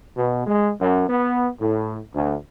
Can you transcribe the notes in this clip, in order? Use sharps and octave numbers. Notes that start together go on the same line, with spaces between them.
B2
G#3
F#2
B3
A2
D2